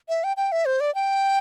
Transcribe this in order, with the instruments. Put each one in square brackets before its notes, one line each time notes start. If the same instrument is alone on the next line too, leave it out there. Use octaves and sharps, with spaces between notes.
[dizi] E5
G5
G5
E5
C5
D5
G5